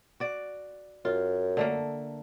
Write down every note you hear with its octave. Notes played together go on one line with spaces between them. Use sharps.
F#4 D5
F#2 F4
D3 A3 A#3